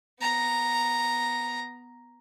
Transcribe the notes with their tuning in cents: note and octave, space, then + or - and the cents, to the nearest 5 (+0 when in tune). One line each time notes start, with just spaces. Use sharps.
B3 +0 A#5 +0